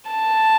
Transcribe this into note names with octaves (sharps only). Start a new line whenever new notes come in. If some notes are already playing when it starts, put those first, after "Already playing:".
A5